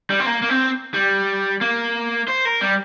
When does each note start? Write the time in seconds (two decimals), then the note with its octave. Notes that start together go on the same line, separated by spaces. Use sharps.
0.10 G3
0.20 C4
0.27 A#3
0.43 A#3
0.50 C4
0.94 G3
1.61 A#3
2.28 C5
2.45 A#4
2.61 G3